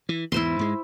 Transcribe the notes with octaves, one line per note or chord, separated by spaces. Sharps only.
E3
E2 G#2 E4 C5 C6
G#2 G#3